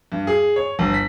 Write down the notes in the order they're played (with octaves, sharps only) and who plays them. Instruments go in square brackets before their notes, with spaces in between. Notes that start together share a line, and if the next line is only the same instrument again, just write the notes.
[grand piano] G2
G#4
C#5
G1
B6